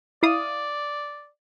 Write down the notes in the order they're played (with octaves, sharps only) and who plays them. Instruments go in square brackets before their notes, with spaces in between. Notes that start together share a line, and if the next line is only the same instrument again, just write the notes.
[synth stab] E4 F5 D#6 [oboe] D5